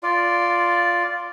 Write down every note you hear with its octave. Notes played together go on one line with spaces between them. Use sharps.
F4 D5